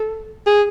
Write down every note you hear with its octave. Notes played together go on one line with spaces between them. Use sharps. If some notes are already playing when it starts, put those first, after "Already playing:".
Already playing: A4
G#4